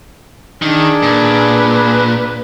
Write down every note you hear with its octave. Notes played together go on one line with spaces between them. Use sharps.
D#3 D4 G#4
A#2 B4